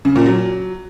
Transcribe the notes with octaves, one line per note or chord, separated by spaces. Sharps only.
C#3
A#2
F#3